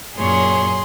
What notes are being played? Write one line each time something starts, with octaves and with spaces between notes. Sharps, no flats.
F#2 A#2 G#4 C#5 C6